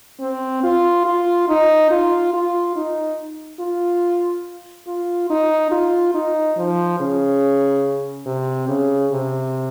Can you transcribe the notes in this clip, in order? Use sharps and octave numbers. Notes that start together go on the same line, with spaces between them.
C4
F4
F4
D#4
F4
F4
D#4
F4
F4
D#4
F4
D#4
F3
C#3
C3
C#3
C3